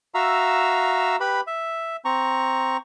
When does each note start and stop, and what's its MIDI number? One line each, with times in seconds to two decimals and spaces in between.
0.15 1.16 66
0.15 1.16 76
0.15 1.16 77
0.15 1.16 82
0.15 1.16 88
1.20 1.41 67
1.20 1.41 71
1.20 1.41 83
1.47 1.96 76
2.05 2.77 60
2.05 2.77 82
2.05 2.77 85